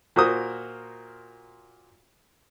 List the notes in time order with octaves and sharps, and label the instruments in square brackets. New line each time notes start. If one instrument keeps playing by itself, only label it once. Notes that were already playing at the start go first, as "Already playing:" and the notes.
[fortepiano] A#2 F#4 A#4 C5 D#6